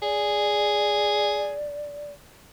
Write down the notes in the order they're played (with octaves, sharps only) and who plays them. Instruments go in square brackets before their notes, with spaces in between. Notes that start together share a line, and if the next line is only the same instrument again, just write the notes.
[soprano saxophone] G#4 [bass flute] D5